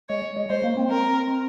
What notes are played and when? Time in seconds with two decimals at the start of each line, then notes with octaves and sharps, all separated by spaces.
0.09 G#3 C#5
0.37 G#3
0.50 G#3 C5
0.64 A#3
0.77 C4
0.91 A#4